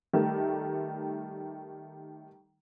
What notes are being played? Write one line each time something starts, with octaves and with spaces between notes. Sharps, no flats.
D#3 G3 A3